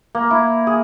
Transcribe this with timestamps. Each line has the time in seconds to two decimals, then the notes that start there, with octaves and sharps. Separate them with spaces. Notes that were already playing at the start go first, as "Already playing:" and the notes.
0.15 A#3
0.31 E4
0.67 G#4